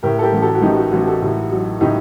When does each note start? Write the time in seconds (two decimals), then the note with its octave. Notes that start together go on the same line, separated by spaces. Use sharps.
0.03 A2 G4 A#4
0.19 A4
0.23 G4 A#4
0.32 A1
0.42 F#4 A4
0.55 F#4
0.62 A1 D#4 G4
0.77 F#4
0.91 A1 F#4
1.07 F#4 A4
1.22 A2
1.51 F#3
1.81 A2 D#4 G4